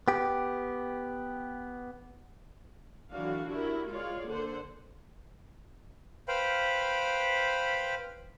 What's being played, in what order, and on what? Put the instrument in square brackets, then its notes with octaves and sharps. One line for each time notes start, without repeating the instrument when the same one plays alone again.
[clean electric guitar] B3 G4
[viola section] D3 E3 F#3 D4 F#4 F5
D4 E4 F#4 G4 A#4
G#3 F4 C#5 D5 F5
D3 A#3 A4 C5 F#5
[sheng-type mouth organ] B4 C5 F5 G5 B5